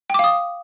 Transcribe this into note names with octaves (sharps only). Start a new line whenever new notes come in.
F5 G5 D6 D#6